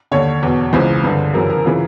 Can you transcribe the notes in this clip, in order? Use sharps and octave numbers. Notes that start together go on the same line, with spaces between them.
D#2 D3 C#5
E2 B2
C#2 C#3 E3 C5
G2 D3
F#2 C#3 E3 A#4
A#4
C#3 E3 F4